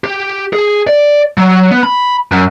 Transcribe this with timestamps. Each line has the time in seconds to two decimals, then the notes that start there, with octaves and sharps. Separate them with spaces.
0.04 G4
0.53 G#4
0.87 D5
1.38 F#3
1.71 B3
1.83 B5
2.32 F#2